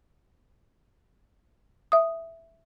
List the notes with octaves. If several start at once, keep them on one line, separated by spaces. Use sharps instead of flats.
E5 D#6